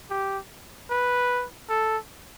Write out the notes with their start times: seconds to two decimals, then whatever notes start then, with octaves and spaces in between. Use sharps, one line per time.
0.10 G4
0.90 B4
1.70 A4